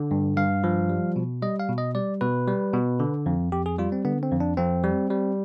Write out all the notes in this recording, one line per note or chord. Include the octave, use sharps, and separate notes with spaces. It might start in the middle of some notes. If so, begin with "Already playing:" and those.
Already playing: D3
G2
G2 F5
F3
G3
B2
G3 D#5
F5
B2
D#5
G3 D5
B2 B4
G3
B2
D3
F2
F2 G4
G#4
G3 F4
C4
D3 B3
C4
F2
D4
F2 C4
G3
G3